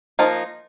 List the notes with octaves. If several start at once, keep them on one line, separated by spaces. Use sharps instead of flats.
F3 A#3 D#4